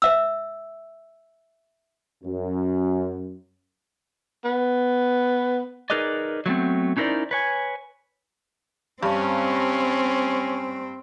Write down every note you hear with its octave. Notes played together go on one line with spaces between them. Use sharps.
C5 E5 E6
F#2
B3
D#4 G#4 A#4 B4 D5 D#5
F#3 A3 B3 C4
C#4 D#4 E4 A#4 C5 D5
B4 C#5 G#5
G2 C4 C#4